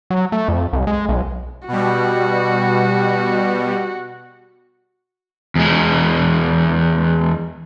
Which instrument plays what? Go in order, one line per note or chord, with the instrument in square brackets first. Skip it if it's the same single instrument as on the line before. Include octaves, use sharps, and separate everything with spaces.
[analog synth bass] F#3
A3
F2
C2
G#3
B1
[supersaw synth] B2 G3 [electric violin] F#4
[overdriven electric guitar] E2 G#3